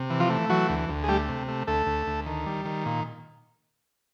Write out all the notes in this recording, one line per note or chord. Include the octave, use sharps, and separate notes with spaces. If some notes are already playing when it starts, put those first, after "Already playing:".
Already playing: C3
E3
F3 F4
A3
E3 F#3 F#4
D2
D2
G#4
G3 A3 G4
C3
A3
D2 A3 A4
D2
D2
D#3
G3
D#3
A#2